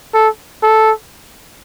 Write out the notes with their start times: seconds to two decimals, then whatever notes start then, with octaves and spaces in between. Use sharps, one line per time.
0.14 A4
0.63 A4